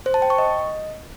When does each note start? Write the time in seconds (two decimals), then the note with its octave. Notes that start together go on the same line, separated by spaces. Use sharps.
0.06 C5
0.14 A5
0.22 G5
0.30 C#6
0.38 D#5